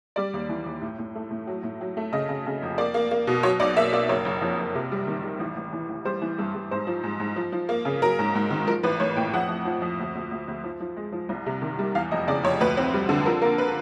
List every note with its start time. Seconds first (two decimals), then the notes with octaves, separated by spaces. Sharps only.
0.16 G3 D5
0.33 D#2
0.49 E3
0.66 D#2
0.81 A2
0.98 A2
1.15 A3
1.31 A2
1.47 F#3
1.63 A2
1.81 F#3
1.97 A3
2.12 C#3 D#5
2.29 C#3
2.46 C#3
2.62 F1
2.78 A#3 D5
2.94 A#3
3.11 A#3
3.27 B2
3.43 F#3 C#5
3.60 B1 D5
3.76 A#3 E5
3.93 A#3 D5
4.09 F#1 C#5
4.25 F#1
4.42 F2
4.59 F#1
4.75 C3
4.92 G3
5.07 D#3
5.24 G3
5.40 A1
5.56 A1
5.73 E3
5.89 A1
6.05 G3 C5
6.22 E3
6.39 G2
6.55 G2
6.71 G#2 C5
6.87 F3
7.03 G#2
7.20 G#2
7.36 F3
7.52 F3
7.69 A#3
7.85 C#3
8.02 F#3 A#4
8.19 G#2
8.35 G#2
8.51 D#3
8.67 F3 A#4
8.83 A1 B4
9.00 A1 C#5
9.16 A2 G5
9.33 F2 F#5
9.49 F2
9.65 F3
9.82 F2
9.99 D2
10.15 D2
10.31 D2
10.48 D2
10.64 F3
10.80 F3
10.96 G#3
11.12 F3
11.29 C2
11.46 C3
11.62 D#3
11.79 G3
11.95 E2 F5
12.11 F1 D#5
12.27 C#3 D5
12.43 F1 C#5
12.60 D2 B4
12.77 C4
12.94 G3
13.09 D3
13.26 F3 A#4
13.42 A#3 A#4
13.58 B4